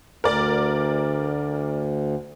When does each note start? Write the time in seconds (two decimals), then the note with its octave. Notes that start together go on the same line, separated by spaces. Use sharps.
0.24 D2 A#4 D5